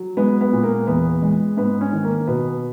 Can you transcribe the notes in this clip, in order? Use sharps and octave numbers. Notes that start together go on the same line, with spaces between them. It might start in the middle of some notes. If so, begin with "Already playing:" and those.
Already playing: F#3
G#3 B3
B3
A#2
A#3
E2 B3
G#3
G#2 B3
C#4
D#3
A#3
B2 B3